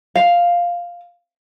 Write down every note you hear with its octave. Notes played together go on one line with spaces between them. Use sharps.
F5